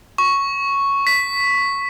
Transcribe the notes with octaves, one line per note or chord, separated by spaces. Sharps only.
C#6
B6